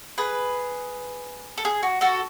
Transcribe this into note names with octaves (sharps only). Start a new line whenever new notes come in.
G#4 B4
A4
G#4
F#4
F#4 A4